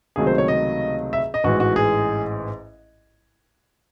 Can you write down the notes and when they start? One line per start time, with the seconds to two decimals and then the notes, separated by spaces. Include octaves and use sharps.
0.16 C#2 C3 D#3 F#3 A3 G#4
0.27 C5
0.38 C#5
0.48 D#5
1.13 E5
1.34 D#5
1.44 A1 G#2 E3 F#4
1.60 F#4
1.76 G#4